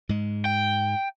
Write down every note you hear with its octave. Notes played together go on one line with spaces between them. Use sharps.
G#2 G#3
G5